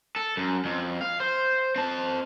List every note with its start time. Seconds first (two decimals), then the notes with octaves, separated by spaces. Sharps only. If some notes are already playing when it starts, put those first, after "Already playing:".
0.16 A4
0.37 F#2
0.65 F2
1.01 F5
1.20 C5
1.76 C4 A5